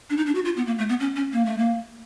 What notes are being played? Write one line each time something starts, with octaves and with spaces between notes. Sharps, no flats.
D4
D#4
D4
F#4
F4
B3
A#3
A3
B3
C#4
C#4
A#3
A3
A#3